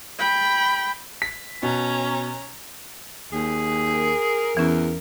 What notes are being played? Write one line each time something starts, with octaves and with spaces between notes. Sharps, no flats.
G5 B5
B6
B2 C#4 A#5
D#2 G#4
A#4
E2 E3 C#4